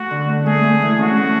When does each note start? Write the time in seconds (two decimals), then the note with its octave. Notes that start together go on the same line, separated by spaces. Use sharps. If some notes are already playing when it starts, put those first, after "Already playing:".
Already playing: A3 F#4
0.11 D3
0.29 A3
0.45 A3 G#4
0.63 A3
0.82 E3
0.99 C#4 F#4
1.17 A3